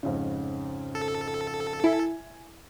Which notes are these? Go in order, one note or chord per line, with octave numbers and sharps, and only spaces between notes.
F2 G#2 C#3
A4
E4 G#5